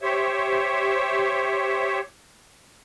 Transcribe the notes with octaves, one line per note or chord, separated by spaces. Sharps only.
G4 C5 C#5 E5